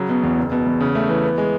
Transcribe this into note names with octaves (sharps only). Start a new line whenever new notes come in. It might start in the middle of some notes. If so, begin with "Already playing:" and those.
Already playing: C#3 F#3
B2
E2
F#1
B2
E2
C#3
A3
E3
B3
G#3